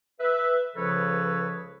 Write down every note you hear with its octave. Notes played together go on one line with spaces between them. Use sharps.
B4 E5
C#2 C#3 F3 A4 B4 C#5